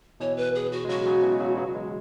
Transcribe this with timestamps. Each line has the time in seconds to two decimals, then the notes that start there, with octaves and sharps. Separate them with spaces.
0.20 B2 E3 C#5
0.37 B4
0.55 G#4
0.72 F#4
0.85 G#3
0.88 C#3 F#3 F#4
1.06 C#3 F#3
1.23 B2 E3
1.40 C#3 F#3
1.58 C#3 F#3
1.75 E3 G#3